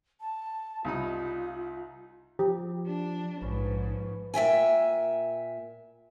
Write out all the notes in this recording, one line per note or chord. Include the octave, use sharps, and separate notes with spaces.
A5
C2 D#4 F4 B5
F3 G4
D4
A#1 G#2 F3 C#4 B4
A#2 E5 G5 G#5